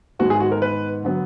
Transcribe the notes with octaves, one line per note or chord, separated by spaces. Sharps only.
G#2 D#3 G#3 B3 F#4
G#4
F#4
A#4
B4
D3 F#3 B3